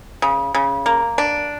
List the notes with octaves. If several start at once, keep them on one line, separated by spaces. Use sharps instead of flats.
C#3
C#3
A#3
D4